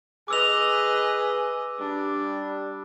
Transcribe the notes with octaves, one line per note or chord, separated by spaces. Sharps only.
G#4 B4 D#5 D6 E6 F7
G3 D4